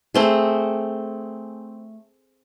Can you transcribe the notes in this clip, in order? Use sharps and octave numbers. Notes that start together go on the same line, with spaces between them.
A3 C4 G#4